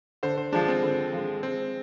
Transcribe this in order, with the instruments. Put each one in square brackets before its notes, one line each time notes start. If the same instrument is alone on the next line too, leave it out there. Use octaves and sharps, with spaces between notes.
[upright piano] D3 [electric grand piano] C5
[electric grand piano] C5
[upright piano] F3 G#3 [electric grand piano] D4
[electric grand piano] C4
[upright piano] D3
F3 G#3
[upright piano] G#3 [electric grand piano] C4